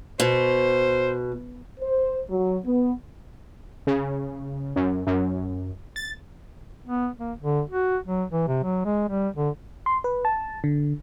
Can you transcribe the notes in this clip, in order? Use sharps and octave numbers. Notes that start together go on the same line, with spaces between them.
B2 C5
C5
F#3
B3
C#3
F#2
F#2
A6
B3
A#3
D3
F#4
F#3
E3
C3
F#3
G#3
G3
D3
C6
B4
A5
D3